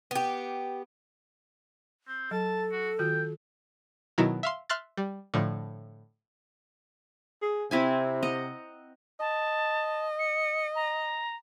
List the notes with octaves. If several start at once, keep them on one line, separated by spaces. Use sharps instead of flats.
B3 G4
C4
F#3 A4 A5
F#4
D#3 F4 F#4 G5
B2 D#3 F#3 E4 F#4
E5 F5 C6
E5 C6 F6 F#6 A6
G3
A2 D3 F3
G#4
C3 C4 E4 G#5
D#5 F#5 A#5
D#5 A5
C#7
A#5